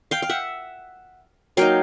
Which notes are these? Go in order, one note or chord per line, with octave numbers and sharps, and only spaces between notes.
F5 G5
F5
E5 F#5
F#3 A#3 D#4 F5 G5